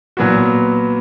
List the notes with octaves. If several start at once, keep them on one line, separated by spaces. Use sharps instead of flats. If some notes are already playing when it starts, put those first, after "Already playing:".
A#2 F#3 B3 F#4